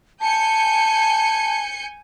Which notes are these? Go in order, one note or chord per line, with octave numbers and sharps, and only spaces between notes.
G#5 A5 G6 C#7